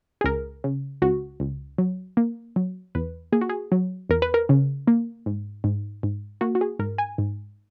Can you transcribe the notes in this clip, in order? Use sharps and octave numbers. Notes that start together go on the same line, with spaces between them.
G#4
C#2 A#4
C#3
C#2 F#4
C#2
F#3
A#3
F#3
E2 B4
A#3 G#4
F#4
G#4
F#3
E2 A#4
B4
A#4
C#3
A#3
G#2
G#2
G#2
A#3 F#4
F#4
G#4
G#2 A#4
G#5
G#2